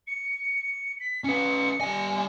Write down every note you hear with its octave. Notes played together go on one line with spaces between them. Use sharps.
C#7
B6
C#4 B4 C#7
G3 G#5